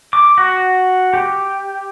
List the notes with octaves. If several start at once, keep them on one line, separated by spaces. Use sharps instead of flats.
D6
F#4
G4